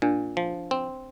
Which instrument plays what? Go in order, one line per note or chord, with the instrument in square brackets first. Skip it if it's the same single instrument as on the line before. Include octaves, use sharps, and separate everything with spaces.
[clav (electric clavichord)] A#2 [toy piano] D4
[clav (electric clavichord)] F3
C4